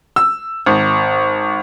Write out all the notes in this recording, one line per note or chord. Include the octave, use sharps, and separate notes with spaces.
E6
G#1